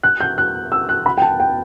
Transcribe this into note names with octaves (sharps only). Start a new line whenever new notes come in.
F#6
G6
F#6
E6
F#6
B5
G5
A5
G5